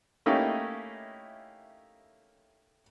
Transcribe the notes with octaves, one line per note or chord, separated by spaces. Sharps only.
A3 A#3 C#4 D#4 E4 G4